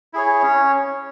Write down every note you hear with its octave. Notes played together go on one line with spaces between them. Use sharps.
E4 G#4 C#5
C#4